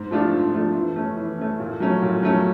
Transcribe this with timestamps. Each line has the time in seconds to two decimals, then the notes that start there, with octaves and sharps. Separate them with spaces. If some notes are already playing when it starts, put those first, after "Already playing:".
Already playing: G#2
0.11 F3 A3 D4 F4
0.32 G#2
0.54 F3 A3 D4 F4
0.75 E3
0.96 A3 C#4
1.17 E3
1.38 A3 C#4
1.60 A#2
1.80 F#3 A3 C#4
2.02 A#2
2.23 F#3 A3 C#4